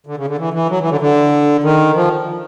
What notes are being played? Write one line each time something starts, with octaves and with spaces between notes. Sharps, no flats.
D3
C#3
D3
E3
E3
F#3
E3
D3
D3
D#3
F3